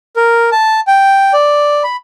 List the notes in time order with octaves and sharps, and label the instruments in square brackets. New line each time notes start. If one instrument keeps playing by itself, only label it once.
[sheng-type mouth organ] A#4
A5
G5
D5
B5